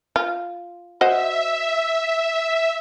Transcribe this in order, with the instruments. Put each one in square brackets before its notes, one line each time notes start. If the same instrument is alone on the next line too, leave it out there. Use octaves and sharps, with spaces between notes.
[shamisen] F4
[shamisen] F#4 C5 D#5 [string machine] E5